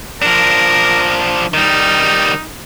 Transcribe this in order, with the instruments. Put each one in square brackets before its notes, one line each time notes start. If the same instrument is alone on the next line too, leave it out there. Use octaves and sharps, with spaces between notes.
[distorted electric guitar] F3 D4 [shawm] A#4
[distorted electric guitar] D#3 G3 [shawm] D#4